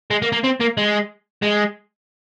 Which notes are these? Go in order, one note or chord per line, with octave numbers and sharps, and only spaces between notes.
G#3
A#3
A#3
C4
A#3
G#3
G#3